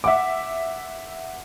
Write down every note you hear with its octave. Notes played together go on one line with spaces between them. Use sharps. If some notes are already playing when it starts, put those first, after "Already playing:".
E5 F#5 D6